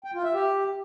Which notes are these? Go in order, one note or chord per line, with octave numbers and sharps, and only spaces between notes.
G5
F4
E5
G4